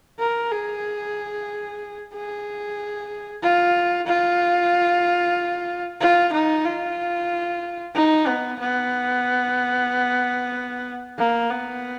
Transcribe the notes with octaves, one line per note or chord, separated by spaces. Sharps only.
A#4
G#4
G#4
F4
F4
F4
D#4
F4
D#4
B3
B3
A#3
B3